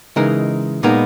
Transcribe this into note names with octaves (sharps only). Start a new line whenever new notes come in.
C#3 E3 G#3 D#4 A#4
A#2 G#3 B3 D#4 A#4